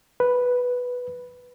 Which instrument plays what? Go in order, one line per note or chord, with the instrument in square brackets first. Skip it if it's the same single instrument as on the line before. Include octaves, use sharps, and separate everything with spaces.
[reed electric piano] B4